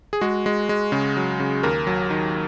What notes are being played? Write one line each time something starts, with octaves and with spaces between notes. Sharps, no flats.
G#4
G#3 F#4
G#3
G#3
C#3
F#3
C#3
D#2 A#4
F#3
D#3